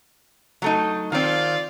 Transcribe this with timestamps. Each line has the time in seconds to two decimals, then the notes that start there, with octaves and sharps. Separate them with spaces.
0.62 F#3 A3 D#4
1.12 D#3 C4 F4 D5 F5